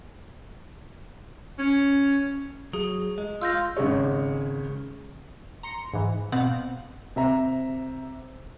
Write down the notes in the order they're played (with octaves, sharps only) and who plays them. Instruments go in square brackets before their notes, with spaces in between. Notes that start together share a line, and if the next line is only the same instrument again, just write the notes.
[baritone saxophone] C#4
[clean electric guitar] F#3 [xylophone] G#4
[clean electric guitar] G#3
[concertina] F4 [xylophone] E6 G6 A#6
[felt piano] G#1 C#3 G#3 C#5
[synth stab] A#5 C6 C#7
G#2 E3
B2 B3 C4 F5 F#5
[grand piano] C3 E5 A#5